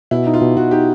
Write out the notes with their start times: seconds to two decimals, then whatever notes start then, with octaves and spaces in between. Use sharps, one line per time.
0.11 B2 E4
0.27 D#4
0.34 F4
0.42 B2
0.57 B2 F#4
0.71 D#4 G4